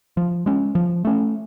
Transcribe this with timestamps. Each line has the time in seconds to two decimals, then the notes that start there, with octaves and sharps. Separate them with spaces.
0.17 F3
0.46 G#3 C#4
0.75 F3
1.05 A3 C#4